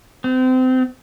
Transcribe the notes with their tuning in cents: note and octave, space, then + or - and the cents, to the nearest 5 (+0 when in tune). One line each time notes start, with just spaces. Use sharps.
C4 -30